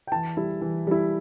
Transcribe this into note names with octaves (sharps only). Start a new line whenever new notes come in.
G5
E3 A5
G3 E4
E3
G3 E4